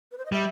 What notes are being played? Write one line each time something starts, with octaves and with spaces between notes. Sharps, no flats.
B4
C5
D#5
G3 E5